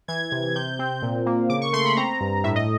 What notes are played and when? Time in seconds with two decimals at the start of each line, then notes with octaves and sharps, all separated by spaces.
0.08 E3 G#6
0.32 C3
0.55 C3 G6
0.79 C4
1.02 A#2
1.26 A#3
1.50 C#3 D6
1.61 C#6
1.73 A3 C6
1.85 B5
1.97 C4 A#5
2.21 G2
2.44 A2 E5
2.56 D#5